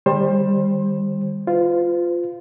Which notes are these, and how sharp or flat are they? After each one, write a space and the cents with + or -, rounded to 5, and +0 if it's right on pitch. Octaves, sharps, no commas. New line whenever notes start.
D#3 -20 G3 +20 C5 +25
F4 +0 C5 -45